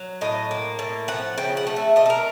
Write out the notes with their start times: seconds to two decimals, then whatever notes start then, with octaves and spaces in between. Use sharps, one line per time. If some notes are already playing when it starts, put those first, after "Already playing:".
Already playing: F#3
0.21 A2 D#5
0.51 A#3
0.79 A2
1.08 F3 F#5
1.38 C#3 G5
1.57 F#5
1.67 A3
1.76 E5
1.96 A3 D#5
2.06 A4
2.10 A#4